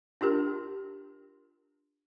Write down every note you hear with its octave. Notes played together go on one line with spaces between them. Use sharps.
D4 F4 G4 A#4